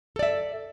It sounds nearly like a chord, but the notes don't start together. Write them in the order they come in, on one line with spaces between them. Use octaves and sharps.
A4 D5 E5